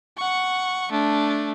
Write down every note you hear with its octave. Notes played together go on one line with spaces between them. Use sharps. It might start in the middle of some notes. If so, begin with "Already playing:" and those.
F#5 C#6
A3 D4